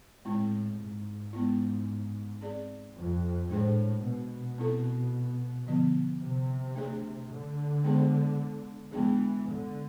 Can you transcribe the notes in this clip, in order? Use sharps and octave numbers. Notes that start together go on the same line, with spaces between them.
A2 G#3 C4 E4
G#2
G#3 B3 E4
C4 G#4 D5
F2
A2 G#3 D4 G#4 C5
B2
C4 E4 A4
D3 F3 B3
C3
A3 D4 G#4
D3
G#3 B3 D4 G#4 C5
E3 G#3 B3 D4 G#4
D3